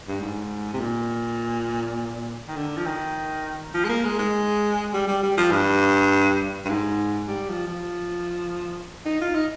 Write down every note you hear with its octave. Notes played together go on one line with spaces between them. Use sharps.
G2
G#2
C3
A#2
D#3
D3
F3
D#3
F3
G#3
A#3
G#3
G#3
G3
G3
G3
F3
G2
G2
G#2
G3
F3
F3
D#4
F4
D#4